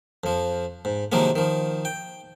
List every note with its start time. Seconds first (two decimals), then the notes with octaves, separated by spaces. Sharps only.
0.24 F2 F3
0.85 G#2
1.12 C3 D#3 F3 F#3 G#3 A#3
1.36 D#3 F3
1.85 G5